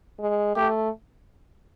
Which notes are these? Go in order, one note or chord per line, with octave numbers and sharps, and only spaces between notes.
G#3
A3 G4